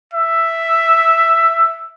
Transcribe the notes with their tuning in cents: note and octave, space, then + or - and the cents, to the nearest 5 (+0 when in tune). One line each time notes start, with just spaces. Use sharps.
E5 +5